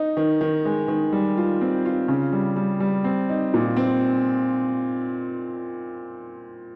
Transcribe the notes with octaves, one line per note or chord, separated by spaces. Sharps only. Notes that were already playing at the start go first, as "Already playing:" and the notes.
Already playing: D#4
D#3
D#3
G#3
D#3
G3
F4
C4
F4
C#3
G3
G3
G3
C4
D#4
A#2
C4